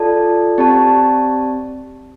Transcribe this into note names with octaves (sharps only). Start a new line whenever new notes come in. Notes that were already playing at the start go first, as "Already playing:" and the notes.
Already playing: F4 A4 D5 A5
C4 G4 D5 A5